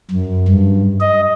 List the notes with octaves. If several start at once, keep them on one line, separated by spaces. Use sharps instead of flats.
F#2
G2
D#5